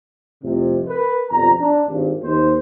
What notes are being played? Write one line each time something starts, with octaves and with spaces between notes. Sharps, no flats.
C2 F2 A2 C3
A#4 B4
G1 F2 B2 G3 A#5
D4
G#1 G2
D#2 C5